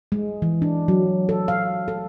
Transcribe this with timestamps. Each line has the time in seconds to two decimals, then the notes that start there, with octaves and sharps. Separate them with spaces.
0.12 G#3
0.42 E3
0.62 D4
0.88 F#3
1.29 A4
1.48 F5
1.88 A4